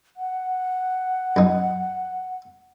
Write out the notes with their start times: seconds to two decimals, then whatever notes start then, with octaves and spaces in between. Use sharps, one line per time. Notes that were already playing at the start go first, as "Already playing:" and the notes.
0.17 F#5
1.36 F#2 D#4